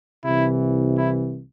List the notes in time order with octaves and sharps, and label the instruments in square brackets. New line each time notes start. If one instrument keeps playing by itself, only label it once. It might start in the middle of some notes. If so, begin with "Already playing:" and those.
[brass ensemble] C2 C3 E3 E4
E4